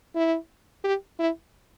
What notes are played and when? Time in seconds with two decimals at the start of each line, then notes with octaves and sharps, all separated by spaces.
0.16 E4
0.84 G4
1.19 E4